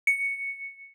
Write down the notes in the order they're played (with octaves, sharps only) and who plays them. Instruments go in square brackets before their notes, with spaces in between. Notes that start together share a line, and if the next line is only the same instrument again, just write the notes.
[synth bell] C#7